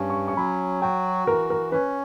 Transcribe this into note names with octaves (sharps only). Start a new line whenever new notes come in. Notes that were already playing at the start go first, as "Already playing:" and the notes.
Already playing: G2 C#4
C#6
C#6
F#3 B5
F#4 G5
E3 A#4
A#4
C#4 B4